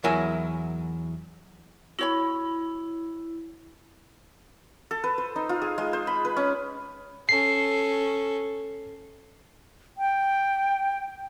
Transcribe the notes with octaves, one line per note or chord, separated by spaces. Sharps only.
E2 F#3 E4 A#4 G#5
E4 F#4 C#5 B5
A4
B4
C5
D#4
F4
G#4
G#3
C5
B5
B4
C#4
C#4 A4 C7
G5